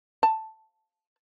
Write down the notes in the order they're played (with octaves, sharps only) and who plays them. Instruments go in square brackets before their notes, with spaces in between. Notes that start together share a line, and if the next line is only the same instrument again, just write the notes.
[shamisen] A5